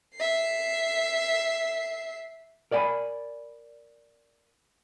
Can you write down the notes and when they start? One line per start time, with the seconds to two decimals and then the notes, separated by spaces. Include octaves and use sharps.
0.16 E5 C7
2.71 A#4 D5 D#5 G5 G#5 B5